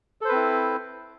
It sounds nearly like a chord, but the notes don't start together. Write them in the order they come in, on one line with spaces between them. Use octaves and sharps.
A4 C5 B4 C4 E4